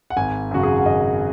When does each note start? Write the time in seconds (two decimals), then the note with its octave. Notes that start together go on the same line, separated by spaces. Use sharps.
0.10 F#5
0.17 G#1 G#5
0.51 F#2 C#3 F#4
0.63 G#4
0.77 F#5
0.85 G#1 D#5